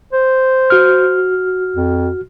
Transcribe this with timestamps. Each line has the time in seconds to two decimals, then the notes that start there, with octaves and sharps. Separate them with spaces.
0.13 C5
0.70 F#4 F6
1.76 F2